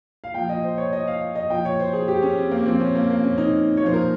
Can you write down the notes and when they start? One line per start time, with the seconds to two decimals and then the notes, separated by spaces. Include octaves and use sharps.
0.24 F5
0.34 A#2 F3 G5
0.49 D#5
0.64 C5
0.78 C#5
0.93 D#5
1.07 F5
1.35 D#5
1.50 A#2 F3 G5
1.65 C#5
1.79 C5
1.93 G#4
2.08 G4
2.22 C#4
2.37 C4
2.51 A#3
2.66 A#2 F3 C4
2.80 C#4
2.95 A#3
3.10 A#3
3.24 C#4
3.38 D#4
3.77 C#5
3.82 A#2 F3 C5
3.93 A#4